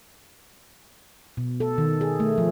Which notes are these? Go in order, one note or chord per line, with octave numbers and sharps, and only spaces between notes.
B2
A4
D#3
G#4
A3
F3